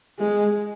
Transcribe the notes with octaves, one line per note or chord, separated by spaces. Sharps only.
G#3